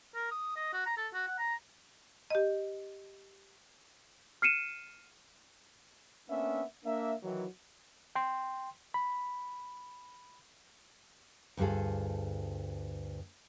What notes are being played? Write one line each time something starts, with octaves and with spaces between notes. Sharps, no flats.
A#4
D#6
D#5
F#4
A#5
A4
F#4
F#5
A#5
G4 D#5
F6 C7 C#7 D#7 E7
A#3 B3 C#4 D4 E5
A#3 D4 E5
D#3 E3 F#3
G5 C6
B5
D2 G2 F4 G#4 A4